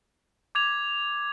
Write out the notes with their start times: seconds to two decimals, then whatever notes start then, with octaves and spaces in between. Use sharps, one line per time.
0.55 D6 G#6 F7